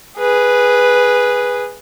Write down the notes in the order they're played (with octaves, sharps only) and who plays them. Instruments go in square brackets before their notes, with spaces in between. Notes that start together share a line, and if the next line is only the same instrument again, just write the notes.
[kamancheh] G#4 B4